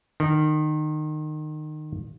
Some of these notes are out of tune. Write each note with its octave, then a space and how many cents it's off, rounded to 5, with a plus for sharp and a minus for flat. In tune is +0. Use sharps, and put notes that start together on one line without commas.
D#3 -25